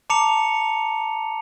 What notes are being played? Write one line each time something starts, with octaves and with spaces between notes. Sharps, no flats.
A5 A#5 D6 C#7 F7